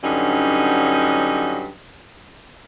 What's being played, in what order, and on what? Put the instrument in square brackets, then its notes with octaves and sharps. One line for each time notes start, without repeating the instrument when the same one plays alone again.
[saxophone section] G2 D3 F#3 C#4 D#4